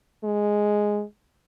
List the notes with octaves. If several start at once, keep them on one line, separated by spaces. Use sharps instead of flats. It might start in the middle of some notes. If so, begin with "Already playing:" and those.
G#3